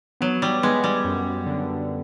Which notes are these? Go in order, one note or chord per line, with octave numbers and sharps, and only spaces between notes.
F#3 B3
G3
G#3 B3
G3
F#2
D3